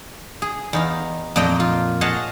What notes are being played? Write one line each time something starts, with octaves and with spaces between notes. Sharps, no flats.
G#4
E2 D#4 F5
F2 A#2 A#3 D#5 G5 A#5
F4
G#4 C#5 D#5 F5 F#5 A5